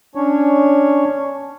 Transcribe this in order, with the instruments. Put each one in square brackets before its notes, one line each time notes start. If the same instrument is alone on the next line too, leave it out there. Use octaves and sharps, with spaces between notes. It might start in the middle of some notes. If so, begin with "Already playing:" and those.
[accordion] C#4 D4 C#5